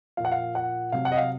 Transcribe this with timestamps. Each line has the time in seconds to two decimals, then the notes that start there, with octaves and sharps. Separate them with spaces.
0.17 A#2 F3 F5
0.25 F#5
0.32 F5
0.55 F#5
0.92 C3 F#3 F5
1.05 F#5
1.12 D#5
1.17 F5